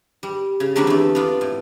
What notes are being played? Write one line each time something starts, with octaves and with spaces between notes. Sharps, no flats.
G3
C#3
D3 F#3 G3 A#3 C4 D4
E2 A3
B3 D4 F4 D5
A2